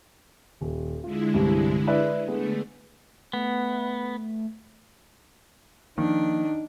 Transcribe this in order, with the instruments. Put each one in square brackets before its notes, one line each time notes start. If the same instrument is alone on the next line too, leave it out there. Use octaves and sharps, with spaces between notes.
[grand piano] D#1
[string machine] D3 G#3 E4 [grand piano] F4
[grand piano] C2 G2 C3
B4 D5 E5
[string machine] D3 A3 [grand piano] G#3 B3
[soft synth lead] A3 [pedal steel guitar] B3
[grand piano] D#3 [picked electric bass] F3 A#3 [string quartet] D4 [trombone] D#4